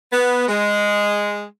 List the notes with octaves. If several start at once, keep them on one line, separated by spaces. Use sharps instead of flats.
B3
G#3